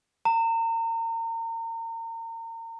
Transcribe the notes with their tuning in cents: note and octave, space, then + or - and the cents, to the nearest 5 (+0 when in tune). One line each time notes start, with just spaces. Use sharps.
A#5 -35